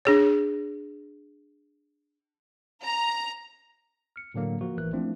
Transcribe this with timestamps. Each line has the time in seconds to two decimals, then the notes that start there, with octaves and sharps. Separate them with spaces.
0.05 D4 G#4 C#5
2.83 A#5
4.16 F6 C#7
4.34 A2 D3 F#3 A#3
4.61 F3 A#3 F#4
4.77 A1 E3 A#4 F#6
4.93 F3 A3 C4 D4 E4